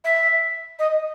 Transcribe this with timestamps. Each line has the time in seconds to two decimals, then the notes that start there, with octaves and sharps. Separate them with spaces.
0.04 E5
0.79 D#5